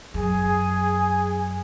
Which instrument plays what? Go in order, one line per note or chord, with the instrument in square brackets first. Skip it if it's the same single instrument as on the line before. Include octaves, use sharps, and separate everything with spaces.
[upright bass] F#2 [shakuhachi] G#4